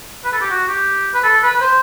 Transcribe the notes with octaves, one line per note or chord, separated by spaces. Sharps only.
B4
A4
G4
F#4
G4
B4
A4
B4
B4
C5